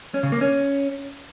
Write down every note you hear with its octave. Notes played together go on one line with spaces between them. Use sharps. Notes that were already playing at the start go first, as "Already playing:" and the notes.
C#4
C#3
A#3
C#4